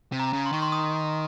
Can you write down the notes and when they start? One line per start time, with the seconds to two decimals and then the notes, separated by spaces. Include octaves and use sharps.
0.12 C3
0.19 A#5
0.33 C#3
0.46 C6
0.53 D#3 C#6
0.62 C6
0.72 D#6